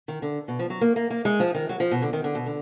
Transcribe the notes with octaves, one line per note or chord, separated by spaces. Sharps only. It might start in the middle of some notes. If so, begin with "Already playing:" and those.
D#3
D3
B2
F3
F#3
A#3
A#3
A#3
G#3
F3
D#3
F#3
F3
B2
D3
D#3
D3
B2
D3